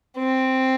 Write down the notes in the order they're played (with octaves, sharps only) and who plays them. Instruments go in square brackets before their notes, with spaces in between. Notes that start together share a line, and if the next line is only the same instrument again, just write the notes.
[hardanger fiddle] C4